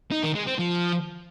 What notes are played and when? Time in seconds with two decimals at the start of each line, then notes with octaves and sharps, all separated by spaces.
0.12 D#4
0.23 D#3
0.35 G#3
0.47 C4
0.58 F3